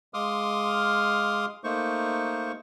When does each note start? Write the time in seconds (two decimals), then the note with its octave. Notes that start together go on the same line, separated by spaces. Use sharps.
0.14 G#3 F5 C6 D6 D#6 F6
1.64 A3 A#3 D#4 C5 C#6